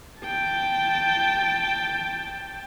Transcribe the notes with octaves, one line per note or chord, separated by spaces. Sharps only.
G5 A5